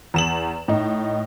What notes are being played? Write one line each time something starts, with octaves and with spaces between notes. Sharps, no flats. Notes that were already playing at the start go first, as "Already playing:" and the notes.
E2 E7 F#7
A2 D#4